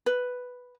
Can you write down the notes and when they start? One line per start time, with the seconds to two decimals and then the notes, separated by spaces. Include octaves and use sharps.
0.06 B4